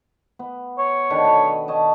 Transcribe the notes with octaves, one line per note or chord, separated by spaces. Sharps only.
B3
C#5
D3 D#3 B4
B2 D#5 B5
C#5 D#5 A5